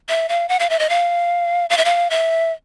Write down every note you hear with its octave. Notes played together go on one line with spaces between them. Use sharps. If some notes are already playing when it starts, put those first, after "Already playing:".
E5
F5
F#5
F5
E5
D#5
F5
F5
E5
F5
E5